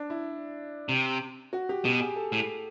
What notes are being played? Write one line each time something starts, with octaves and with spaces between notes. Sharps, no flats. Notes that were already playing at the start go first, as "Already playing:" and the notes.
Already playing: D4
E4
C3
F#4
G4
B2 G4
G#4
A4
A2